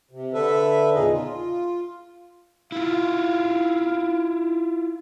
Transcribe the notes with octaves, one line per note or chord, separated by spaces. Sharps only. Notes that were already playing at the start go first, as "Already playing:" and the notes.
C3
D3 A4 B4 E5
E2 A#2 C#3 D#4 G#4 D#5
F4
E4 F4 F5